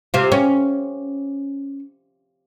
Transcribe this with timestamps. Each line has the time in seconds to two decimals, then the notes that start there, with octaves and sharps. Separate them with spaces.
0.14 C3 F4
0.32 C#4